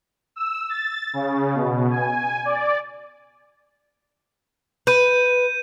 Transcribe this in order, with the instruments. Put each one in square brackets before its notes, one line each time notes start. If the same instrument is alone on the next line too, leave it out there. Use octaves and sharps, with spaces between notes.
[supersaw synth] E6
A6
C#3
B2
G#5
D5
[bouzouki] B4 [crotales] G6 D#7